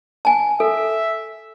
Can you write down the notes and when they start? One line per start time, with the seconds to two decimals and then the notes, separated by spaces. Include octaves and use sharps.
0.25 G#5 A5
0.60 A4 E5